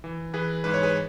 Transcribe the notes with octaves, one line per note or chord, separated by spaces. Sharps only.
E3
E3 G#4 B4
G#2 B4
C#5
G#4 B4